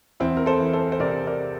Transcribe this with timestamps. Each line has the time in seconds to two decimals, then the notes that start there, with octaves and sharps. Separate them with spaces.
0.20 E2 C4 E4
0.37 A#4
0.46 A4 C5
0.60 E3
0.73 A4 C5
0.92 C5
1.00 C3 A#4 D5
1.27 A#4 D5